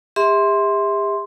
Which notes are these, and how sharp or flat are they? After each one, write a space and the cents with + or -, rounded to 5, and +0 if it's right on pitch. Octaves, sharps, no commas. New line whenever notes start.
G4 +45 E5 -25 C6 +0